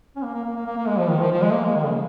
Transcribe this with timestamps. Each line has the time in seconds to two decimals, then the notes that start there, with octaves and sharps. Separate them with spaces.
0.16 C#4
0.22 A#3
0.34 A#3
0.45 A#3
0.56 A#3
0.66 A#3
0.77 A#3
0.88 G#3
0.99 F3
1.10 D#3
1.20 F3
1.31 F3
1.42 G#3
1.53 A#3
1.64 G#3
1.75 D#3
1.85 C#3